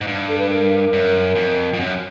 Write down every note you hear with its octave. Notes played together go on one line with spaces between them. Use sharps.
G#2
G2
A4
B4
A#4
F#2
F2
F2
F#2